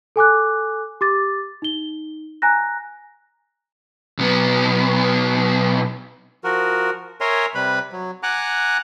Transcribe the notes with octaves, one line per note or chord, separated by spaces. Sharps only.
A4 G#5 D6 F#6
G4 D6 A6
D#4 G7
G#5 A#5 F#6 A#6
B1 B3
F3 F#4 A#4
A#4 C#5 E5 G#5 A#5 C6
C3 G3 B4 B5
F#3
F#5 G#5 A#5 D6 F#6